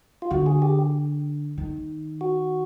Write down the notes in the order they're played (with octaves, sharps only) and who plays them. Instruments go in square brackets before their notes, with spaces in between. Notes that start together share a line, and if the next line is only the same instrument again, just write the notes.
[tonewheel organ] F4
[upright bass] D3 [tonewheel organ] F#4
[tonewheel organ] G#4
G4
[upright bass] D#3
[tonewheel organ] F#4